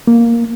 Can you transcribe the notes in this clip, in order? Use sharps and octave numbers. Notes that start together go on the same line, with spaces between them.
A#3